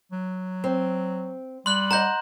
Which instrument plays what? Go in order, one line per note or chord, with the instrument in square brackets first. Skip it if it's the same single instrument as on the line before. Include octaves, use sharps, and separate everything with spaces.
[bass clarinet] F#3
[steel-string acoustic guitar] C4
[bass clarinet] G3 [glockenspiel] C6 F#6 F#7
[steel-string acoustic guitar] D#5 F#5 [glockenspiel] A#5 C6 G6